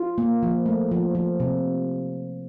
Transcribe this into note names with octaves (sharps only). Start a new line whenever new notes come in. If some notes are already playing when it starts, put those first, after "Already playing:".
Already playing: F4
A#3
F3
A3
F3
F3
C3